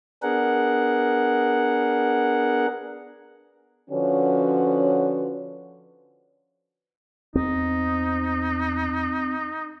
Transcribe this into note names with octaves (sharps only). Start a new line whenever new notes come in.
B3 D4 G#4 A#4 F#5
D3 F3 C#4 F#4 B4 C#5
E2 C4 D#4